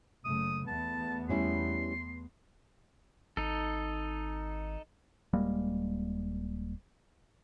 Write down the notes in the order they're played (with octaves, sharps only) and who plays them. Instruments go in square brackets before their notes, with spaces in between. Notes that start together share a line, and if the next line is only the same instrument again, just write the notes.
[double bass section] F#1 C#3 A3 [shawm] D#6
[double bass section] E2 A3 B3 [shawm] A5
[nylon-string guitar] G3 C#4 E4 [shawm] C6
[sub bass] G#1 [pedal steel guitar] D#4 A4
[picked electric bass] D#1 G3 G#3 A#3